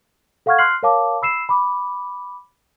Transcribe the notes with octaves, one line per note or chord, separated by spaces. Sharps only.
A4 F5 F#5 C#6 F6 G#6
C6 F6 F#6 C7 F#7
A#4 C#5 F5 A5 D6
B5 E6 C7 E7
B5 D6